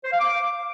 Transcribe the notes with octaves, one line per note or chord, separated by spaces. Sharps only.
C5
F5
D6